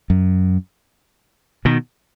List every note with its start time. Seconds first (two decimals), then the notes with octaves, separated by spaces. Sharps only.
0.10 F#2
1.65 B2 D#3